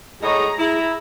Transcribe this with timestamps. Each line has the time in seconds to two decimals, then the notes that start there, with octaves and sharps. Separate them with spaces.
0.22 A2 G#4 C#5 D#5 A#5
0.58 E4